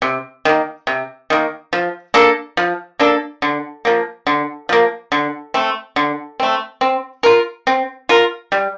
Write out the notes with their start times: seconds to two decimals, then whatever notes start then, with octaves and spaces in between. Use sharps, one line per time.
0.02 C3
0.45 D#3 A#3
0.87 C3
1.30 D#3 A#3
1.73 F3
2.14 A#3 D4 A4
2.57 F3
2.99 A#3 D4 A4
3.42 D3
3.85 F3 A#3
4.27 D3
4.69 F3 A#3
5.12 D3
5.54 A3 C4
5.96 D3
6.40 A3 C4
6.81 C4
7.23 F4 A#4
7.67 C4
8.09 F4 A#4
8.52 G3